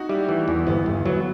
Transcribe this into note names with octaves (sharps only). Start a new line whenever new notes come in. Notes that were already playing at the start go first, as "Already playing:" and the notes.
Already playing: D#4 F#4
G3 E4 G4
E3 A3
E2
G1 B3
G1
F#3 B3